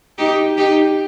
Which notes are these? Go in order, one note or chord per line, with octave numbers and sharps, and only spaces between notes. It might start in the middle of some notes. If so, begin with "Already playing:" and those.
D#4 G4
D#4 G4